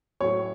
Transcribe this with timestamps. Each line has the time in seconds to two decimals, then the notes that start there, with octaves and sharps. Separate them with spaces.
0.21 A2 F#3 C#5